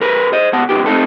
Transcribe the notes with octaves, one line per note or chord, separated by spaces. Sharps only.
B1 A#4 B4
C5 D#5
C#2 B3 F#5 A5
C#2 F#2 D#3 B3 G4
A3 C4 D#4 A4